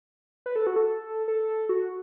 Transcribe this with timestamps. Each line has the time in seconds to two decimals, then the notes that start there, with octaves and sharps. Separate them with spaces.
0.46 B4
0.56 A4
0.67 F#4
0.76 A4
1.28 A4
1.69 F#4